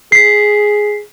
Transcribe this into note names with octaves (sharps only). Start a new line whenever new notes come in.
G#4 B6 C7